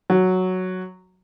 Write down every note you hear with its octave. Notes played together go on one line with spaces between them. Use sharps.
F#3